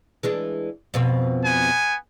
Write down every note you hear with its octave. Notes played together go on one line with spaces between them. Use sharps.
E3 G#3 D4
F2 B2 C4
B3 G#5